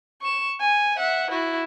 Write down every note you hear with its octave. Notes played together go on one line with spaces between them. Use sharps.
C#6 E7
G#5
E5 F#5
E4 F#4